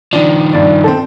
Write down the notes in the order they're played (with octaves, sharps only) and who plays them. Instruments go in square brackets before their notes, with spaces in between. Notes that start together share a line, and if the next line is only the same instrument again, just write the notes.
[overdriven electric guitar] D#3 F3 [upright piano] D4
[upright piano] G2 D5
C4 A4